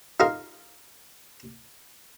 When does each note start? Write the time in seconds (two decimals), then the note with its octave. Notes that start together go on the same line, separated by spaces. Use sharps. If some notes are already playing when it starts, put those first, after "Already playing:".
0.20 D#4 F4 A#4 F5